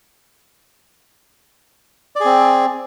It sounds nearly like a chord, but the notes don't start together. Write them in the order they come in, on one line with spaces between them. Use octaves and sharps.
D5 G#4 C4